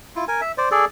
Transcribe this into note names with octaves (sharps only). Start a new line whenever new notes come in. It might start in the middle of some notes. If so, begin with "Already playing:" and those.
E4 F4
A#4 G#5
E5
C5 D5
G#4 A4 D5